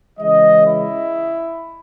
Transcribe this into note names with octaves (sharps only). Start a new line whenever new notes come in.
C#3 E3 G#3 D#5
E4